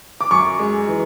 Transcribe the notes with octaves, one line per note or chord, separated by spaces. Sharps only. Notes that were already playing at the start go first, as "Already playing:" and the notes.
D6
F#2 C#6
G#3
E3